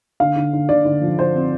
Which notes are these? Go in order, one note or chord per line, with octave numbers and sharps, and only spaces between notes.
D3 F5
D3
D3
D3 D5
D3
F3
F3 C5
C4